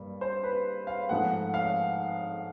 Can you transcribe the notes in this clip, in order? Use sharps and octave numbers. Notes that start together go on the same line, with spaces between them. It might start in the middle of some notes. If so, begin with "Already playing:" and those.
Already playing: G2 G3 A#3
C5
B4
F5
G#2 F3 A3 F#5
F5